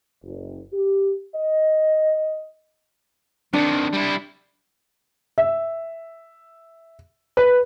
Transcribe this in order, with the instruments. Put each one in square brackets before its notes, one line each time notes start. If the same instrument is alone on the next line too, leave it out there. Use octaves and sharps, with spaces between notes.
[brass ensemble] F#1
G4
D#5
[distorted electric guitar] C3 D#3 [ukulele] D4
[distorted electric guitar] G3 E4
[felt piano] E5
B4